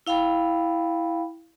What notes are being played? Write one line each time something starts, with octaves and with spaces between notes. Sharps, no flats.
E4 F5 G5 B5